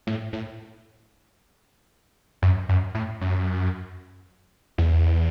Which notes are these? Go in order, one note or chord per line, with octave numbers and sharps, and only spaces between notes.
A2
A2
F#2
F#2
A2
F#2
E2